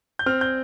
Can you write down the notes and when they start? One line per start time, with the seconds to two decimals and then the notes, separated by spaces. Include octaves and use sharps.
0.19 G6
0.26 C4 F6
0.41 G6